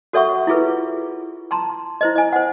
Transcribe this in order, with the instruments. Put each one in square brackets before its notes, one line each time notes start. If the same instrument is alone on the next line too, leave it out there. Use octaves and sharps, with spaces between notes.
[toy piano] F#4 A4 C#5 E5 F#5 C#6
E4 F4 G#4 B4
A5 A#5 C6
E4 C5 D#5
D#5 G#5
C5 F#5